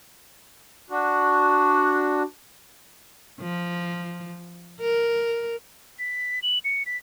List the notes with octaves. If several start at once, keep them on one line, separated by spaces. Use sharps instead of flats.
D4 F#4
F3
A#4
B6
F#7
C#7
B6